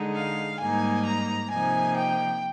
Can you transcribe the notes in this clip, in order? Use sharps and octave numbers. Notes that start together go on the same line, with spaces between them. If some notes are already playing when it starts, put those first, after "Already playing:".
Already playing: D3 G#3 D#4
F5
G#2 G3 A#3 D#4 G#5
A#5
C3 F3 A#3 D#4 G#5
G5